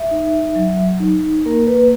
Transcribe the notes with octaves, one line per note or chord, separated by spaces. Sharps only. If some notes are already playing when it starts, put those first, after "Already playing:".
Already playing: E5
D#4
F#3
D#4
A#3 A#4
B4